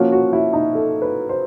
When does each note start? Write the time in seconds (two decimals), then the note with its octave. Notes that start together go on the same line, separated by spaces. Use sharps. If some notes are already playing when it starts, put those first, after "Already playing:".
Already playing: F3 A#3 C#4 F#4
0.12 F#4
0.33 E4
0.53 D#4
0.75 A4
1.02 B4
1.29 C5